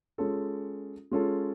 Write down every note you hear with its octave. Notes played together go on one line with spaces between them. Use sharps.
G#3 C#4 F4 A4
G#3 C#4 F4 A4